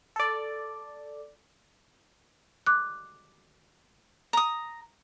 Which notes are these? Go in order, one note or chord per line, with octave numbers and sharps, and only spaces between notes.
A4 D5
D6 F#6
A#5 D#6